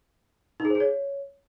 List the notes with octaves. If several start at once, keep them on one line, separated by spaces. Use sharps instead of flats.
D#4
G#4
C5
G#4
C#5